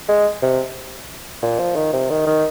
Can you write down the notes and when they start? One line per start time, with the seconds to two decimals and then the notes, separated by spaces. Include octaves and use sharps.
0.09 G#3
0.42 C3
1.42 A#2
1.59 F3
1.75 D#3
1.93 C3
2.10 D#3
2.26 D#3